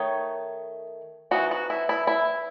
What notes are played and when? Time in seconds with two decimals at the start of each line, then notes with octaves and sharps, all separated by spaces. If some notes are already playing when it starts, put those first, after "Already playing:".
Already playing: D#3 A3 D#4 C#5
1.31 E3 C4 D#4 F#4
1.51 F#4
1.70 E4
1.89 E4
2.07 E4